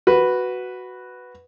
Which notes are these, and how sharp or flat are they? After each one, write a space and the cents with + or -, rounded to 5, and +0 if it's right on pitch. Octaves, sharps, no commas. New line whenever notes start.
F#4 +0 B4 +0